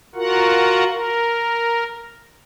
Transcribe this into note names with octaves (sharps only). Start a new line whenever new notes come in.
F4 F#4 A#4 F#5
A#4